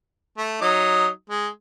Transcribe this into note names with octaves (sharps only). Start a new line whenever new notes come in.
A3
F#3 D#4 D#6
G#3